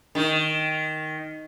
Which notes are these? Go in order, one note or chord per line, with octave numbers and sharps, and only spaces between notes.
D#3